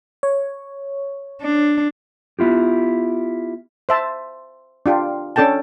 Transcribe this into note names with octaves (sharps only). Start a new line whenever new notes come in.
C#5
D4
B3 E4 F4 G4
C5 E5 A5
D4 F4 G4
C#4 D4 A4 G5 A5